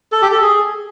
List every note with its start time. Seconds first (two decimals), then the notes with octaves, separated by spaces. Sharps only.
0.12 A4
0.22 G4
0.32 A4
0.42 G#4